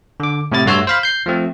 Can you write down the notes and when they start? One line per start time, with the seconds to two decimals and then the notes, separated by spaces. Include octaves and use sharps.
0.20 D3 D6
0.52 A2 C3 E4 A6
0.66 G2 A3 F#4 C#5 C6 E6
0.87 C5 F5 B5
1.03 G6 C7
1.26 F3 A3 C4